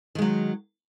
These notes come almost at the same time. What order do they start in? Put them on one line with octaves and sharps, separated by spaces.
D#3 G#3 F#3